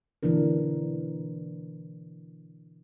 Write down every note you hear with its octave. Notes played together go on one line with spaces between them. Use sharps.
B2 D3 E3 A#3 D4 A#4